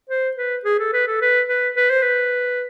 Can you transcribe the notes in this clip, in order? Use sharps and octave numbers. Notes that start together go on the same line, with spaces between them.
C5
B4
G#4
A4
B4
A4
B4
B4
B4
C5
B4